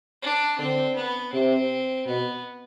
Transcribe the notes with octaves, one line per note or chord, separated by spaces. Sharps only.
D4
D3 C4
B3
C3 C4
B2 B3